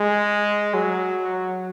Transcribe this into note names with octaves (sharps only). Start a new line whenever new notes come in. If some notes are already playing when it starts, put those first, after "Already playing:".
Already playing: G#3
F#3